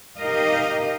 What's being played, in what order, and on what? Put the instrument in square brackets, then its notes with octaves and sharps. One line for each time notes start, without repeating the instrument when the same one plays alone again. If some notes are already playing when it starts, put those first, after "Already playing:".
[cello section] D#4 G4 A#4 D#5 F5